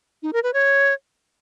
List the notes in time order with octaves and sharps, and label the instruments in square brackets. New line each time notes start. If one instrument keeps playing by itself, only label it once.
[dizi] D#4
A#4
B4
C#5